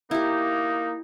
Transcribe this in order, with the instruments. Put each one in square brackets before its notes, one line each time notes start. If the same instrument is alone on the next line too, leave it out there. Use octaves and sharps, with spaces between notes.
[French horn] A#3 [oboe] D#4 [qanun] E4 G4